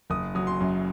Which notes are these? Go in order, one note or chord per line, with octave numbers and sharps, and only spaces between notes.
F#1 D#6
F#3 D#6
C6
F#2